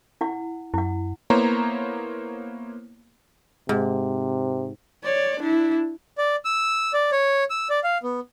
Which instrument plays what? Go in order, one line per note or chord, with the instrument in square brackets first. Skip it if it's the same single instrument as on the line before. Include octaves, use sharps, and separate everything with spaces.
[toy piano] E4 F#5
[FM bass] F#2 [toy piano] E4 F#5
[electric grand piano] A#3 B3 E4 C5 C#5 A#5
[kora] G#2 [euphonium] C3
[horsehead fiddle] C#5 D5
D4 E4
[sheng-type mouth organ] D5
E6
D5
C#5
E6
D5
F5
B3